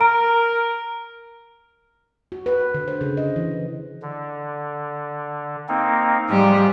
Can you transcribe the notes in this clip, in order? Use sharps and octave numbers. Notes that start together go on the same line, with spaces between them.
A#4 A#5 D7
F#4
B4
D3
C5
C#3
D#5
E3
D3
A#3 C4 D#4
G#2 F3 G3